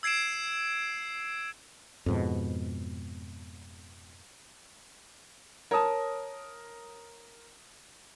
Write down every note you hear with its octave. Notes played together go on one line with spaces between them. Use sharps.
E6 G#6 C7 D7 E7
F2 G#2 B2
A#4 C#5 A5 D#6